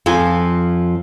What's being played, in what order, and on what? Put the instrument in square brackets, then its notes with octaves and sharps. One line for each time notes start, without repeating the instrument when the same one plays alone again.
[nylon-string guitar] F2 F3 F4 G#5